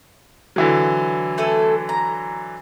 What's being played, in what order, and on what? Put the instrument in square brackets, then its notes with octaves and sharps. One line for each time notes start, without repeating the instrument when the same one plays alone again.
[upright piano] D3 E3 F#3
[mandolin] A3 A4 G#5
A#5